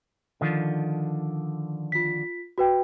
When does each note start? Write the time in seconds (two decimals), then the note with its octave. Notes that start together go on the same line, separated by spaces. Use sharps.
0.41 D3 D#3 F3
1.92 F4 B6
2.58 F#4 B4 G5